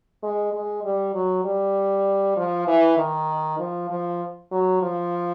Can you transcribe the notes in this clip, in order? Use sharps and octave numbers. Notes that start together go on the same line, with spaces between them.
G#3
G#3
G3
F#3
G3
F3
E3
D#3
F3
F3
F#3
F3